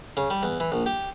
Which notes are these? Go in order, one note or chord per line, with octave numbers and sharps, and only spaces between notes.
C#3
G3
E2
E3
A#1
G4